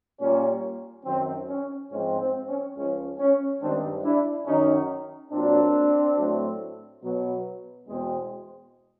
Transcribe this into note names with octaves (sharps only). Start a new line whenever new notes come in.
A#2 G3 A#3 C#4
F#2 D#3 F#3 C4
C#4
G#2 F3 G#3 C4 C#4
C4
C#4
C#2 C#3 F3 C#4
C#4
G2 D#3 G#3 C4 D4
D4 E4
F#2 D#3 F#3 C#4 D#4
A#2 F#3 A#3 C4 D4
A2 F#3 A3 C4
B2 F#3 B3
E2 B2 G#3 C4